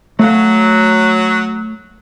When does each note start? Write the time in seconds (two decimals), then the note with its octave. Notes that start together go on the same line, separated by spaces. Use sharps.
0.19 F#3 A3 F5